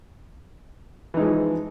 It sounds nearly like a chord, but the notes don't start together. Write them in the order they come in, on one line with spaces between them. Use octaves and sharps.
E3 D#4 G#3 F3